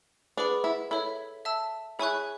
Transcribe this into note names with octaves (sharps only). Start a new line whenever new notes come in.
D4 G#4 B4 F#5 B5 D6
E4
E4 A4 C#5 E5
E5 A5 E6
E4 G#4 C#5 G#5 C#6 F#6